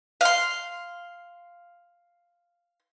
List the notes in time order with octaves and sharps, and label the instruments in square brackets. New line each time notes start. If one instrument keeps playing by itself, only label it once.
[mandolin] F5 C6